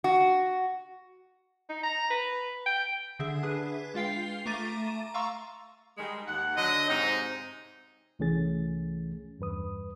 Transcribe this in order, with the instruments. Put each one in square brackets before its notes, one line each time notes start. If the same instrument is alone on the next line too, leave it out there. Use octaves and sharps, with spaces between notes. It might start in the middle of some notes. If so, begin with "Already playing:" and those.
[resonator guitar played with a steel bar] F#4
[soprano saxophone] D#4
A#5
B4
G5
[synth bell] D3 G#4 E5
D4 G#4 B4
G#3 F4 F5 G5 C7
A3 E5 A#5 D6 A6 D#7
F5 A#5 C6 C#6 E6
[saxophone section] D#3 G3 G#3
D#2 F#5
[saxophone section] D3 F#3 [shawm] D#5
[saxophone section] G#2 C3 C4 [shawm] D#4
[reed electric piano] C2 E3 A3 C#4 G#4 A6
E2 G2 B4 D#6